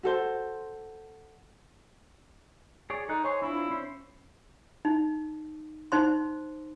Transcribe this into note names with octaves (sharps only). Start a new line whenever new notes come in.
F#4 A4 C5
G#4 C#5 D5
D#4 A4 F#6
C5 C#5 G#5 C6
C4 D4 E4 F4
C#4 C5
D#4
D#4 C5 C6